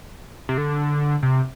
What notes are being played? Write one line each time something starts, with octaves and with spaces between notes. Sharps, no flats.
C3
D3
C3